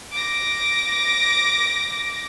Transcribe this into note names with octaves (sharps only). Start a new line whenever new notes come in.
D6 A#6